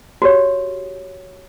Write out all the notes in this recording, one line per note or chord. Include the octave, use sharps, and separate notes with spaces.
F#4 G4 C#5